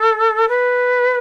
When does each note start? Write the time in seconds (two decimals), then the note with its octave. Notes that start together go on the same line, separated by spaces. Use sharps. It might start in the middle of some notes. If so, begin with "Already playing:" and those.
Already playing: A4
0.48 B4